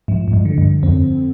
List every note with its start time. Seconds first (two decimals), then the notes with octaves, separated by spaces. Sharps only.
0.08 G#2 F3
0.28 G#2
0.33 G2
0.45 D3
0.58 G2
0.83 F2 C4